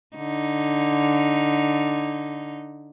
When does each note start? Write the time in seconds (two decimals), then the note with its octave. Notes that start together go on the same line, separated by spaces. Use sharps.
0.16 D3 D#4